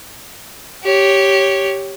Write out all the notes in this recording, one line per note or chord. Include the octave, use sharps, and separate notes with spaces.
G4 C#5